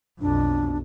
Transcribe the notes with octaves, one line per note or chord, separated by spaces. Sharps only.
B1 F2 D4